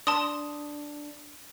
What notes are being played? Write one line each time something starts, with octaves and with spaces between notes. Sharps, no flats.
D4 A5 C6 D#6